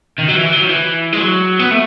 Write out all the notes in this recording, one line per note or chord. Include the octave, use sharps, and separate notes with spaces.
D#3
F#3
E3
F#3
D#3
E3
G#3
F#3
B3
A3